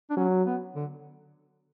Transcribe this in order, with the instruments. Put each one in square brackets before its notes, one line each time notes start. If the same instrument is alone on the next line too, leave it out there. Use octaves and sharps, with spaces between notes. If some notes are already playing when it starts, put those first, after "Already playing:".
[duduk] D4
[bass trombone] F#3 [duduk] C#4
[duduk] B3
D3